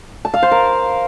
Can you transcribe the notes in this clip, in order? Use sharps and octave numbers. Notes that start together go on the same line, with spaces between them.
A5
F5
C5
A#4